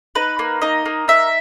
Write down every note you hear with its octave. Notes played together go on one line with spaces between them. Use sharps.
D#4 B4
A#3
D#4 D#5
A#3
D#4 E5